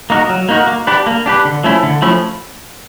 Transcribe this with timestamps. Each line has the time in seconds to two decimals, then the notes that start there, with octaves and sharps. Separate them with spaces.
0.10 A#3 D#4 F#4 A#4
0.30 F#3
0.49 A#3 D#4 F#4 A#4
0.67 A#3
0.87 D4 G4 B4
1.06 A#3
1.26 D4 G4 B4
1.45 D3
1.64 F3 A3 C#4 E4
1.83 D3
2.02 F3 A3 C#4 E4